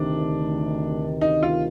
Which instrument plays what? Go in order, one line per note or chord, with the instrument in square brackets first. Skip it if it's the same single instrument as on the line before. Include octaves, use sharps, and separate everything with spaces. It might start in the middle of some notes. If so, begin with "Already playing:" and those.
Already playing: [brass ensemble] D2 C3 D#3 [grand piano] D4
[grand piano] D#4
F4